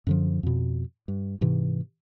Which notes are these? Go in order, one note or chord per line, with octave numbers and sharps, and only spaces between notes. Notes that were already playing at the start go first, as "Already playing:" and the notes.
F#2 D3 F3
F2 B2
G2
G#2 C3 E3